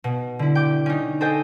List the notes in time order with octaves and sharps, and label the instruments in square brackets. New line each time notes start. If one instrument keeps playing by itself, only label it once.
[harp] B2
D3 E4
G5 D6
C#4 D#4
A4 C5 D#5 G5 G#5